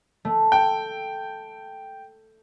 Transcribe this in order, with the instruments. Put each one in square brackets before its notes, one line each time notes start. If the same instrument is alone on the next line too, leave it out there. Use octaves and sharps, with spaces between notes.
[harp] A3
[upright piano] G5